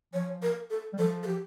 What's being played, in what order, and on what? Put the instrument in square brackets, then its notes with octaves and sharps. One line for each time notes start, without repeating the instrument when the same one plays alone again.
[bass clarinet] F3 [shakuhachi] C#5
[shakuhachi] A#4
A4
[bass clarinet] G3
[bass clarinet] F3 [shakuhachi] A4
[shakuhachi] A4
G4